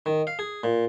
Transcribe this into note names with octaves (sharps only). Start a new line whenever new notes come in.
D#3
F5
G#4
A#2